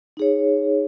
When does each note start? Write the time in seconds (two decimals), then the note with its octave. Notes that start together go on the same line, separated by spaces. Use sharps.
0.17 D#4 G#4 C#5